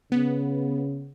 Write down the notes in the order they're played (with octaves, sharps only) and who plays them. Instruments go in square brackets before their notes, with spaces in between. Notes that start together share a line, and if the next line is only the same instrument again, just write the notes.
[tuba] C#3 [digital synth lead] B3